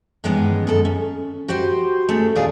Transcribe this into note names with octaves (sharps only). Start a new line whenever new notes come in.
G2 D#3 E3 G#3 B3 C#4
F#2 G#4 A4 A5
C#4
F#4 G4 B4 C5
A3 C#4 G#4 A4
D#2 A#2 D4 F4 G#4 D5